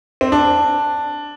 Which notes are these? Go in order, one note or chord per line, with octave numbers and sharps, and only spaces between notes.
C4
D4